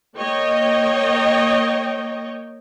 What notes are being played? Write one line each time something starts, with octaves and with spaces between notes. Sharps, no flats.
A#3 C#5 D#5 G5